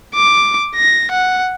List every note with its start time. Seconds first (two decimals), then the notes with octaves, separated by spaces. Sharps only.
0.15 D6
0.76 A#6
1.11 F#5